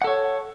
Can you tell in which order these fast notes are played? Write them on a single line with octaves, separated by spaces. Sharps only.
F#5 A4 C#5